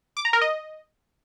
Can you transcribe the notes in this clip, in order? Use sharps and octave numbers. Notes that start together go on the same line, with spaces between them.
D6
A#5
A#4
D#5